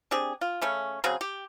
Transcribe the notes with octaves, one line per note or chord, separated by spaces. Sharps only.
C4 D4 G4 G#4
F4
C#3 A3 C#4
C#3 F#3 C4 G#4
G4